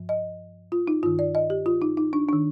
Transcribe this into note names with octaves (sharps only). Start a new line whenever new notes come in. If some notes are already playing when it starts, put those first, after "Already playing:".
Already playing: G2 F3
D#5
F4
D#4
G2 D#3 F4
D5
D#5
G4
F4
D#4
D#4
D4
D#3 D4